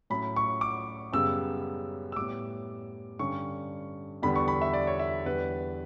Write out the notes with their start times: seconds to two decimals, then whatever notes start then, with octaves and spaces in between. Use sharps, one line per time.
0.10 A2 F#3 C#4 B5
0.36 C#6
0.61 D6
1.13 F#2 C#3 G3 B3 E6
2.12 E6
2.16 A2 G3 B3 D6
3.19 G2 D3 G3 C#4 C#6
4.23 E2 D3 G3 B3 B5
4.36 C#6
4.48 B5
4.62 E5
4.74 D5
4.87 C#5
4.99 E5
5.25 E2 D3 G3 B4